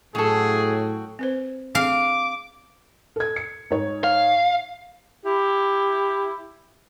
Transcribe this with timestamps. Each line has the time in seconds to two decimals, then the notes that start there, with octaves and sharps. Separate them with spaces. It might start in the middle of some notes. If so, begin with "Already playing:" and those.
0.15 F#2 A2 F#4 G#4 A4 G5
1.19 C4 B4 C5
1.75 C4 G#4 F5 D6
3.16 A4 G#6
3.36 C#7
3.71 G#2 C#5
4.04 F5
5.25 E4 G4